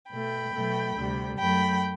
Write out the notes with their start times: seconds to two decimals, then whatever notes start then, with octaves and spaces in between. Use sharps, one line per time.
0.11 B2 A3 G5 B5
0.53 B2 F#3 A3
0.96 D2 C3 G3
1.39 F#2 F#3 A3 G5 B5